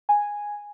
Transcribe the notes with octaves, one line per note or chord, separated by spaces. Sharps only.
G#5